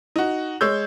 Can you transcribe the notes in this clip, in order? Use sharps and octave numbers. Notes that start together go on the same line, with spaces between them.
D#4 F#4
G#3 C#5 E6 G6